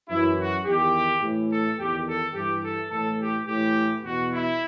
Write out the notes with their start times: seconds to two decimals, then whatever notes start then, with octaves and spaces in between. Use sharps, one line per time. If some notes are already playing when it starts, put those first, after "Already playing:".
0.08 F#2 E3 E4
0.36 F#4
0.64 E2 D#3 G4
1.21 A2 E3
1.49 A4
1.77 E2 D#3 G4
2.05 A4
2.33 G2 E3 G4
2.62 A4
2.90 A2 E3 A4
3.18 G4
3.45 A2 E3 G4
4.02 E2 B2 F#4
4.30 E4